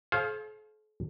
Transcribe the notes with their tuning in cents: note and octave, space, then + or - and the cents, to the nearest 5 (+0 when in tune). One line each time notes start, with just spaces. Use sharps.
A4 -45 C5 +35 F5 +0